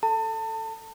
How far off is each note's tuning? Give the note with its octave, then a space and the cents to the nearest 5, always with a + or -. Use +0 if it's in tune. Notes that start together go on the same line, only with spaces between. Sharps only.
A4 +0 A5 +30